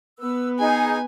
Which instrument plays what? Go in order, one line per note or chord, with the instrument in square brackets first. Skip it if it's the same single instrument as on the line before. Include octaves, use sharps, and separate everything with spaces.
[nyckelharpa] B3 B4 [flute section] E6
[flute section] D#4 G#4 [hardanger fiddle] G#5